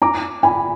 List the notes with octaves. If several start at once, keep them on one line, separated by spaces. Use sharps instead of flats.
A#5 D6
G#5 B5